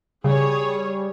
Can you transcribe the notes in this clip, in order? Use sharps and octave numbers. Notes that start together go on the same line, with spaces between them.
C#3 G3 G#4 C#5